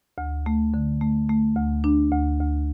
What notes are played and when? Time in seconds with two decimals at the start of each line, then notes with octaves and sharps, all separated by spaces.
0.18 D2
0.46 A3
0.74 D3
1.01 A3
1.29 A3
1.56 D2
1.84 D4
2.12 D2
2.40 D2